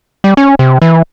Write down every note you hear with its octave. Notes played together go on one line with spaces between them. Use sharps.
G3
C#4
C3
E3